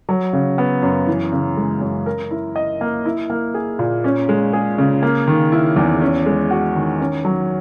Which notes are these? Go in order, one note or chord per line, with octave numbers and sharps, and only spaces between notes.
F#3
C#3
B3
F#2
E3
C#3
G#3
F#2
A#4
E4
D#5
A#3
E4
A#3
G#4
A#2
C#4
G#3
G#4
C#3
A#3
D#3
E4
E2
C#4
G#3
F#4
D#3
C#4
F#3